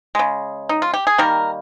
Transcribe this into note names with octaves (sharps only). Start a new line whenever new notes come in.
C#3 G#3
D#4
F4
G4
G#4
D#3 G3 A#3 A#4